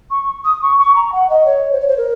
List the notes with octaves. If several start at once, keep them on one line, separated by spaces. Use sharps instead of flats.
C#6
D#6
C#6
C#6
A#5
F#5
D#5
C#5
C5
C#5
C5
A#4